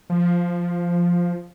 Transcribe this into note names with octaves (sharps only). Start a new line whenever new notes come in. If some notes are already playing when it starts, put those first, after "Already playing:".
F3